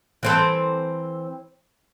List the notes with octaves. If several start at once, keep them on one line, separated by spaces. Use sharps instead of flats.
E3 C4 A4